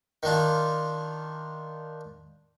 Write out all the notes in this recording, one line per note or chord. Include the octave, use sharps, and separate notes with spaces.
D#3 D4 F4